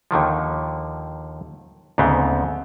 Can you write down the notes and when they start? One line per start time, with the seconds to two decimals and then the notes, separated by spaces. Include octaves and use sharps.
0.11 D#2 D3 D#3 F3
1.98 D2 G#2 C#3 B3 C4